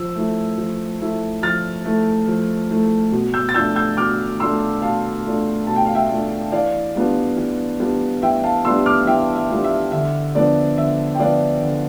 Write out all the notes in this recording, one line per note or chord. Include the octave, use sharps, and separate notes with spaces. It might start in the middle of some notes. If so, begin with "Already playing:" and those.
Already playing: F3 E6
A3 E4
F3
A3 E4
F3 F6 A6
A3 E4
F3
A3 E4
B2
E6 G6
A6
A3 D4 F4 E6 G6
E6 G6
B2 D6 F6
A3 D4 F4 C6 E6
B2 F5 A5
A3 D4 F4
B2 A5
G5
F5
E5 G5
A3 D4 F4
E3 D5 F5
G3 B3 D4 F4
E3
G3 B3 D4 F4
E3 E5 G5
F5 A5
G3 B3 D4 F4 C6 E6
D6 F6
E3 E5 G5
E5
G3 B3 D4 F4
E5
D3 E5
F3 B3 D4 D5
D3 E5
G5
F3 B3 D4 D5 F5
D3